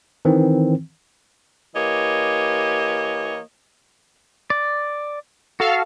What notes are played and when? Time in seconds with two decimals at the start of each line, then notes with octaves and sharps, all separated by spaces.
0.25 D#3 E3 C4
1.75 E3 A#3 G4 C#5 D#5
4.50 D5
5.60 F#4 A4 F5